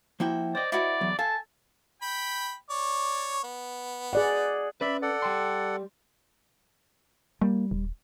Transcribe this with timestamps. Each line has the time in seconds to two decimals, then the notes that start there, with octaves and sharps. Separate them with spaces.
0.20 F3 A#3 E4 F#4 E5 G5
0.55 C5 D5 D#5
0.72 E4 F#4 A4 D5
1.01 E2 F#3
1.19 A4 F5 G#5 A5
2.02 G5 B5
2.70 C#5 D5
3.43 B3
4.13 G#4 D5 F#5
4.81 C#4 B4 D5 E5 B5
5.02 A4 D5 F#5
5.22 G3 G5 C6
7.41 G3 A#3
7.71 D#1